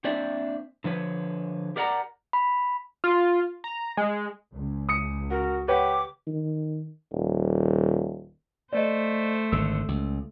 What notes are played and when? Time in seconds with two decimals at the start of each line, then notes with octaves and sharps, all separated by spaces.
0.04 A#3 C4 D4 D5 E5
0.84 D3 F3 B4 C#5
1.76 G4 A#4 D5 F#5 A#5
2.33 B5
3.04 F4
3.64 A#5
3.97 G#3
4.55 C#2
4.89 D#6 C#7
5.31 F#4 A#4
5.68 G4 B4 C#5 F#5 D6
6.27 D#3
7.13 D#1
8.73 A3 C5 D5 D#5
9.52 G#1 D3 E6
9.88 C#2